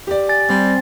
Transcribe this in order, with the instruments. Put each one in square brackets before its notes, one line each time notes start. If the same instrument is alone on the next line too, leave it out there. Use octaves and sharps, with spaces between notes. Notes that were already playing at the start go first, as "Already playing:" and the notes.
[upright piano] G4 D5
[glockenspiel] G#5 A6
[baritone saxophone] G3 [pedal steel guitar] C4